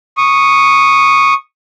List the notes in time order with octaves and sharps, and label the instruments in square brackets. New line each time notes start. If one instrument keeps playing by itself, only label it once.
[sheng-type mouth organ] C#6 D#6